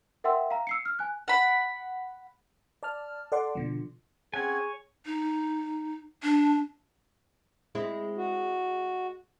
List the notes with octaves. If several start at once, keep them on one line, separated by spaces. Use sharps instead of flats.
A#4 E5 F#5 G5 C6 E6
F5 A#5
E6 C7 C#7
F6
G#5 F#6
F#5 B5
D5 A5 F6
A4 D5 F#5 C6 D6
B2 D3 F3
C4 C#4 G#4 C#5 F#5 G#5 G#6
D#4
D4
G#3 C4 E4
F#4